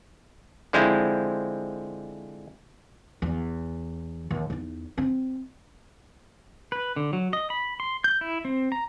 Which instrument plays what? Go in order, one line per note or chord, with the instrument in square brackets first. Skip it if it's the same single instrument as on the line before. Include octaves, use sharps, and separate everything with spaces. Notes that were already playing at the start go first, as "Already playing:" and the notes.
[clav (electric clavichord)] D3 F3 G#3 C4 E4
[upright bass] E2
D#2
E2 D#4
C4
[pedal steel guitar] B4
D3
F#3
D#5
B5
C6
G6
E4
C4
A#5